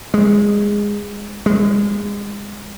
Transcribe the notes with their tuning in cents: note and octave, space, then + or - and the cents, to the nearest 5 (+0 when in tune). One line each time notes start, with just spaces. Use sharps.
G#3 -15
G#3 -30